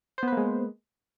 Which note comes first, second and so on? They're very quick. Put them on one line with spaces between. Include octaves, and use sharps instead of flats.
C5 B3 B4 A#3 G#3